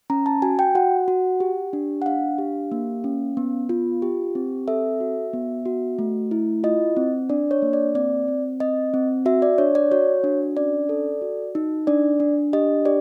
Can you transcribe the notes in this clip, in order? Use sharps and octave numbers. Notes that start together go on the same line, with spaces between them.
C#4 A#5
A5
F#4 G#5
G5
F#4 F#5
F#4
G4
D4
F#5
D4 F5
G4
A#3
C#4
B3
F4
G4
C4
A4 E5
F#4
B3
F#4
A3
E4
F4 D#5
C4
D4 D5
C#5
A#3
D5
C4 D5
C4
C4 D#5
C4
F#4 E5
D5
D4 C#5
D5
F#4 C#5
D4
C#4 D5
A4
F#4
D#4
D4 D5
D4
G4 D#5
G4 D5